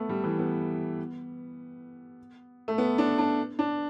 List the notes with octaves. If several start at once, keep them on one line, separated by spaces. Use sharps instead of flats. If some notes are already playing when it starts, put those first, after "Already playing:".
Already playing: A3 B3
G3
E3
B3
A3
B3
D4
D4
D4